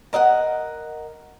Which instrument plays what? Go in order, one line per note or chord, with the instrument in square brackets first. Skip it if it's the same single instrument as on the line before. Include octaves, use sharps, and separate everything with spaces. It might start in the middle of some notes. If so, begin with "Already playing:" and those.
[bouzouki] A#4 D#5 F5 F#5